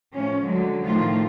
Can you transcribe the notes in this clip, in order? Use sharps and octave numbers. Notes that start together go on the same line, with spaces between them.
A2 F3 C#4
D3 F#3 G#3
A2 D#3 F3 A3 F4